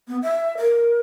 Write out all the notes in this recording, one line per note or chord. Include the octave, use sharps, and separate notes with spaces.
B3
E5
A#4